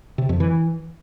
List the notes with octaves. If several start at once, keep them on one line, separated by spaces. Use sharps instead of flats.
C3
F2
E3